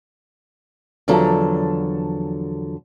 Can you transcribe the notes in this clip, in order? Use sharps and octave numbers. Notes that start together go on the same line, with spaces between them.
E2 D3 F3 F#3 A4 A#5